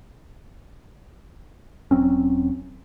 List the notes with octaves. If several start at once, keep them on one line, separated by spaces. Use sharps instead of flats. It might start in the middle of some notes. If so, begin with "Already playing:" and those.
E1 F#3 C4 C#4